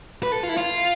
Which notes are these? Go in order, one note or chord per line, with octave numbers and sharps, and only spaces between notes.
B4
A4
F4
E4
F4